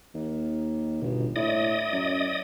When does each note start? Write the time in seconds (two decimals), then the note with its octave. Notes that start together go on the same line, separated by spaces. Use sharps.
0.14 D#2
1.02 G1 B2
1.36 A2 D5 D#5 D#6
1.92 F#2